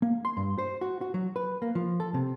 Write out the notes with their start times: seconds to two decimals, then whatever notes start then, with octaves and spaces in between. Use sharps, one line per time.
0.02 A#3
0.25 C6
0.37 G2
0.58 C5
0.81 F#4
1.01 F#4
1.14 F#3
1.36 B4
1.62 A#3
1.75 F3
2.00 A4
2.14 C3